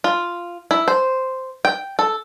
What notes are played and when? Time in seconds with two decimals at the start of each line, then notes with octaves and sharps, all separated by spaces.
0.04 F4
0.71 E4
0.88 C5
1.65 G5
1.99 A4